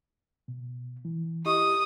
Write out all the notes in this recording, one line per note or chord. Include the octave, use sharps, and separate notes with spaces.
B2
E3
E4 G4 D#5 C#6 D#6